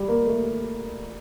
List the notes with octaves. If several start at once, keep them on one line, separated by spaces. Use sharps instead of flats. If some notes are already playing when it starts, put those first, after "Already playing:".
Already playing: G3
A#3
A3